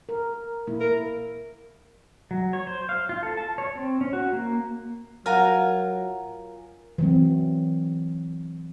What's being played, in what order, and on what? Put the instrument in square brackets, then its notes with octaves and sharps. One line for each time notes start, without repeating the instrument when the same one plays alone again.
[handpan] A#4
A#2 A#3 E4
[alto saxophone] A#4
[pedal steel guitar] F#3
C#5
C5
F5
F4
A4
A5
C#5
C4
C#4
F#4
A#3
[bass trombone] F#3 [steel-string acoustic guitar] F4 A#4 G#5 [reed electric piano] F#5 A#5 F6
[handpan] E3 F#3 C4